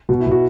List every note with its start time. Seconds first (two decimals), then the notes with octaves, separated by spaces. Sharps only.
0.09 B2 F#4
0.20 E4
0.26 B2
0.32 F#4